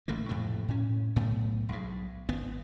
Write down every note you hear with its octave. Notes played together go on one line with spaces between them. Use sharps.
A1 E3 A3 A#3
F2 A2 C3 A3
A2 C#4
B1 A2 A3 B3
B1 G#2
G#1 B3